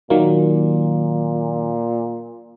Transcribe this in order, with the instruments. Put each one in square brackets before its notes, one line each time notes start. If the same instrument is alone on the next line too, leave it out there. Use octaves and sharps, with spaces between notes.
[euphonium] A#2 [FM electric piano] D#3 F#3 A#3